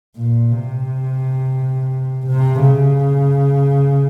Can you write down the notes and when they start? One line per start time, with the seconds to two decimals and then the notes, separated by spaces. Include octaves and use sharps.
0.16 A#2
0.52 C3
2.27 C3
2.62 C#3